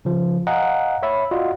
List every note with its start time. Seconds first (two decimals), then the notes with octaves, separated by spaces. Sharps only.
0.05 C#3 F3
0.47 D#5 F5 F#5 G#5 A#5
1.03 C#5 E5 B5
1.31 F4 F#4 D5 D#5 F#5